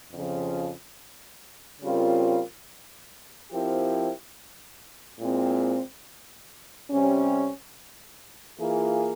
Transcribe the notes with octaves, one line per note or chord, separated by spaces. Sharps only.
F2 C#3 F3
C#3 G3 C4 F4 A#4
F3 C4 E4 G4 A#4
A#2 G#3 C4 E4
C3 G3 C#4
E3 A#3 F4 G#4